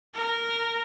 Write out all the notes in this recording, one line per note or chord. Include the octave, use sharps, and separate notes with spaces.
A#4